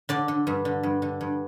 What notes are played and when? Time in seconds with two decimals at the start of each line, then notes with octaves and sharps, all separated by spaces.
0.09 D3 D5
0.28 D3
0.47 G2
0.65 D3
0.83 G2
1.02 D3
1.21 G2